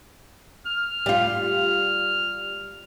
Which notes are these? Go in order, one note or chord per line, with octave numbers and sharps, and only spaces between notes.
F6
G3 F4